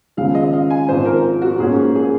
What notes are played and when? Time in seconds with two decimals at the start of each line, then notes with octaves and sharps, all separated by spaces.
0.17 D#2 C#3 F3 G#3 F5
0.35 D#5
0.53 F5
0.70 G#5
0.89 G#1 G#2 F3 C5
1.05 A#4
1.42 F#4
1.59 G#2 F3 A#3 C#4 F#4 G#4
1.95 G#4